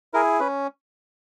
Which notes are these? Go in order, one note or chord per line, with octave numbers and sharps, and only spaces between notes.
E4 G#4 A#4
C#4 B4